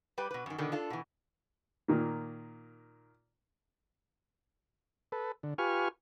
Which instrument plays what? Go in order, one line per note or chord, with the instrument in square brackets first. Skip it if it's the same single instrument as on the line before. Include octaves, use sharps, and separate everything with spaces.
[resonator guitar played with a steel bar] G3 G4 B4
B2 B4
F#2 D#3
B2 D3 D#3
D4 F4 A4
B2 E3
[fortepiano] A#2 D#3 A#3
[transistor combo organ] A4 B4
D3
F4 G4 B4 G#5 C#6 F6